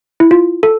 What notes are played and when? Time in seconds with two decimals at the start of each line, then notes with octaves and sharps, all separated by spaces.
0.20 E4
0.31 F4
0.63 A4